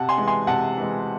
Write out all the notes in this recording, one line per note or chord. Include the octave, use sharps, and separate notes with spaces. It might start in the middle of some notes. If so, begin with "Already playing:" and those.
Already playing: C3 F#5 A5
G#5 C6
E3 G#3
G#5 C6
C3 F#5 A5
E3 G#3